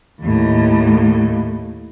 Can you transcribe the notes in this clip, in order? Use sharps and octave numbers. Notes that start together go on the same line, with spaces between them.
D#2 A2